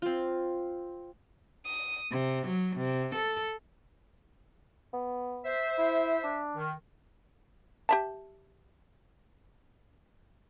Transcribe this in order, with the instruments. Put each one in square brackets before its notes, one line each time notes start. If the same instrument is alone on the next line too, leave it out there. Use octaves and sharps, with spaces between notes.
[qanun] C4 F4
[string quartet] D#6
C3
F#3
C3
A4
[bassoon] B3
[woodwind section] C5 E5
[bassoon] E4
D4
[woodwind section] D#3
[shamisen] G4 E5 A5